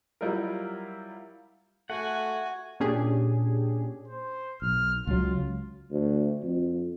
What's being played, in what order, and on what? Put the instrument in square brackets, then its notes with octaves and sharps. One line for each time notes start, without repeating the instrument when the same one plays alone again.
[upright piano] F#3 G3 E4 F4 A#4
[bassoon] A3 [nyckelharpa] F#4 G#5 [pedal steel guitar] F#5
[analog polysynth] A#2 C#4 D4 G4 G#4
[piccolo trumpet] C5
[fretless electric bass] B1 [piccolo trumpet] F6
[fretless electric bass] C#2 F#3 [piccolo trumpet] F4
[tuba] D2
F2